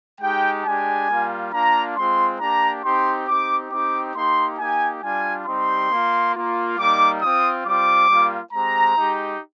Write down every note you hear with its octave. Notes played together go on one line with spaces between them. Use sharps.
G#3 D#4 G4 G5
G#3 D4 G4 G#5
G3 A#3 F4
A#3 D4 F4 A#5
G#3 C4 F4 C6
A#3 D4 G4 A#5
C4 D#4 G4 C6
C4 D#4 G4 D6
C4 D#4 G4 D6
A#3 D#4 G4 C6
A#3 D#4 G4 G#5
G3 D4 F4 G#5
G3 C4 D#4 G4 C6
A#3 F4
A#3 F4
G3 A#3 D#4 D6
C4 F4 D#6
G3 C4 F4 D6
G3 A#3 F4
G#3 C4 G4 A#5
G#3 D#4 G4